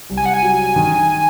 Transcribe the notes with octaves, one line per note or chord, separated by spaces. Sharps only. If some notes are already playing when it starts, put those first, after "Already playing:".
C2
G#5
F#5
G#5
F#3
D#3